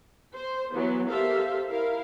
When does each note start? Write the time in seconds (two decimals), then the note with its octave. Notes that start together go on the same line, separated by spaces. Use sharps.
0.34 C5
0.73 E3 F#3 B3
1.08 G4 A4 A#4 C5 E5 F5
1.69 E4 A#4 F5